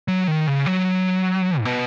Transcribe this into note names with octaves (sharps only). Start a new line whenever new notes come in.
F#3
D#3
C#3
F#3
G#2
B2